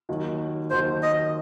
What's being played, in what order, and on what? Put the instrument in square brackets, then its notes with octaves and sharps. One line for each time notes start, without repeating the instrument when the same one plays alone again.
[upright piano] D#2 D#3 F#3
[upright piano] D#2 D#3 F#3 [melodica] C5
[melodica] D#5